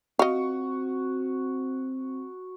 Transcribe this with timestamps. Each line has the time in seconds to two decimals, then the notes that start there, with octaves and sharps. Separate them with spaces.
0.19 C4 F#4 D#5 F5